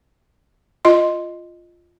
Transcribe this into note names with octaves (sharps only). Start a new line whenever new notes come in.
F4 D#5 C6